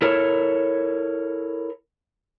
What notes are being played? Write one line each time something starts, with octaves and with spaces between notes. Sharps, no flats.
E4 A4 A#4 C#5